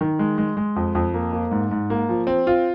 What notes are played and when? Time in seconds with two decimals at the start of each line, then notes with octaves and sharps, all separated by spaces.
0.01 D#3
0.19 G#3
0.38 G#3
0.57 G#3
0.76 F2
0.95 F2
1.14 A#3
1.33 A#3
1.51 G#2
1.71 G#2
1.90 A#3
2.09 F3
2.27 C4
2.47 F4